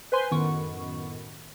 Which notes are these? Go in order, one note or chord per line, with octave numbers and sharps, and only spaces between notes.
B4 C5 G#5 C6
F#2 A2 D#3 B3 C#6